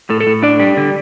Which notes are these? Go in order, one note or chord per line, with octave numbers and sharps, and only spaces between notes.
A2 A4
A4
A2
D4 D5
G3
D3